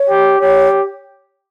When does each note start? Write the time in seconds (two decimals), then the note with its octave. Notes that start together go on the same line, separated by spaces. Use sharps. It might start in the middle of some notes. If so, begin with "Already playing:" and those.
Already playing: C#5
0.10 G4
0.40 G4 C#5